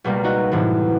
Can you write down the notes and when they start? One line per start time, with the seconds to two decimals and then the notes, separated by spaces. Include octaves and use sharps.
0.04 C#2 B2 G3 A#3
0.24 D#4 F#4 D#5
0.51 F#2 A2 C3 E3